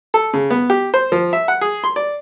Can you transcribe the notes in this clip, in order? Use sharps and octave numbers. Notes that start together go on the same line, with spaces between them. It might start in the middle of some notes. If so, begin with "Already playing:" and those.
A4
C#3
B3
G4
C5
F3
E5
F#5
G#4
C6
D5